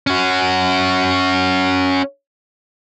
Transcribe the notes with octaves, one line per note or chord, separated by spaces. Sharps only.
C#4 F#4